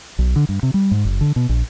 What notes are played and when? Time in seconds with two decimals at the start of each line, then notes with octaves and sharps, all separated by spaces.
0.19 B1
0.36 D3
0.49 G2
0.63 C3
0.74 G3
0.91 G#2
1.05 F#1
1.21 D3
1.36 B2
1.49 A#1